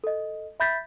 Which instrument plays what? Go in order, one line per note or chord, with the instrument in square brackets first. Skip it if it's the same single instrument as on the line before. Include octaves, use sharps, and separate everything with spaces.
[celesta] A4 D#5
E5 B5 G6 A6 B6